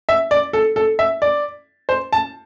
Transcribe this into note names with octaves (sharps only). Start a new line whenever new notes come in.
E5
D5
A4
A4
E5
D5
C5
A5